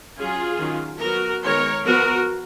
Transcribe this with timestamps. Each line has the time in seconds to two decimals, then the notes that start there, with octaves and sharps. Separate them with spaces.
0.17 F#3 C#4 F4 G#4
0.60 D#3 F#3 C#4
1.01 F#3 B3 F#4 A#4
1.43 D#3 G#3 B3 A#4 C#5
1.85 F3 B3 F#4 A#4